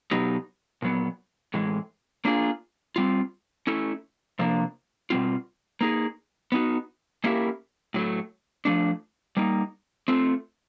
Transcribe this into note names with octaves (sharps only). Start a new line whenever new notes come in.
B2 F#3 B3 D#4 G4
A#2 F#3 B3
A2 E3 G#3
A#3 D4 F4 G#4
G3 C4 F4
A3 C#4 E4
C3 F3 A#3 D4
B2 G3 C4 F4
A#3 D#4 G#4
B3 D#4 F#4
A#3 C#4 E4 G4 A#4
A2 F#3 A3
F3 A3 D4
G3 A#3 D#4
A3 C4 F4